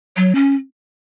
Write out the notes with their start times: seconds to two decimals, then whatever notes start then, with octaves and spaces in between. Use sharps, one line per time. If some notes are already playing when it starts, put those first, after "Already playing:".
0.17 F#3
0.35 C#4